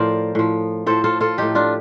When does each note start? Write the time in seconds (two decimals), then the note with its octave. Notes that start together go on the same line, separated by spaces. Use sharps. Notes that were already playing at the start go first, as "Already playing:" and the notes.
Already playing: A2 F3 A#4 C5 D5
0.35 A2 F3
0.86 A2 F3 A4 C5
1.04 F4 A4
1.21 F4 A4
1.38 A2 F3 D#4 G4
1.55 D4 F4